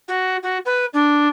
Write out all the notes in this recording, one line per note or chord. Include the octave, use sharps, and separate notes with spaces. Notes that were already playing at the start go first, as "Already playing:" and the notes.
F#4
F#4
B4
D4